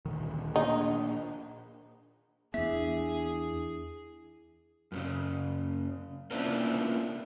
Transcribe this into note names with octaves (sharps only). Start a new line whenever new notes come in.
D2 A#2 D#3
A#2 A#3 D4 D#4
E2 B3 D4 E4 G#4 E5
F#2 A2 C#3
A#3 B3 C#4 D4 E4 F4